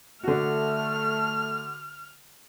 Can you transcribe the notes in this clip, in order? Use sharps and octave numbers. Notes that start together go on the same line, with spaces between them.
D3 A3 F#4 F6